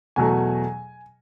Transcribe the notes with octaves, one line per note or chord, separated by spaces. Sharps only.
E2 B2 F#3 A3 G#5